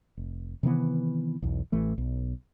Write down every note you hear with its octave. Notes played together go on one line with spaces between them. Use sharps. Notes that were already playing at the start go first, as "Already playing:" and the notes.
F1
C3 D#3 E3 B3
B1 E2
A1 E3 A3
B1